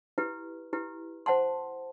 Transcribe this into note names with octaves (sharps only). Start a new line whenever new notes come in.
E4 G4 B4
E4 G4 B4
C5 F#5 A5 C6